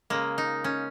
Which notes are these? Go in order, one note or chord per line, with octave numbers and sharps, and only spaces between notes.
C#3 G#3 A#3
D#4
C#4